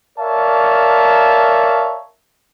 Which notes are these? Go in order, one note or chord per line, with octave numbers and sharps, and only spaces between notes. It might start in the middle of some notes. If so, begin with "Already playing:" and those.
A#4 C#5 D5 E5 F5 A5